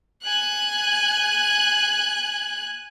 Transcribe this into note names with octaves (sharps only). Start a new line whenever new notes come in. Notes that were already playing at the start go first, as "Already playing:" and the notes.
G#5 F#6